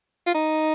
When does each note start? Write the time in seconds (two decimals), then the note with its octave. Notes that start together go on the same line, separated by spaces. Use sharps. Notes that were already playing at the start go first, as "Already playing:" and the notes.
0.26 F4
0.34 D#4